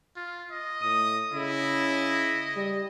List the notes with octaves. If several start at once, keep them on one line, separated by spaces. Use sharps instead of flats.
F4
D#5
A2 D#6
C#3 E4 D#5
G3